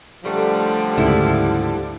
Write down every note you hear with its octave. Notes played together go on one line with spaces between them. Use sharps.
F#2 D3 F3 G3 A3
D2 G#2 C#3 E4 E5